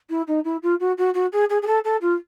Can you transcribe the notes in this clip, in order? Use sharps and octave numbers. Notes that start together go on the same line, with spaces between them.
E4
D#4
E4
F4
F#4
F#4
F#4
G#4
G#4
G#4
A4
A4
F4